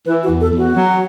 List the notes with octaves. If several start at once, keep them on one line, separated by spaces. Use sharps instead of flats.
E3 B4
F#4
E2
A4
E2
F#4
F#3